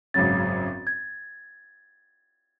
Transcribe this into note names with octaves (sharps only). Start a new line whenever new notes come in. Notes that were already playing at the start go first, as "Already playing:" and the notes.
G#1 F#2 C#3 F#3 C#4 A6
G#6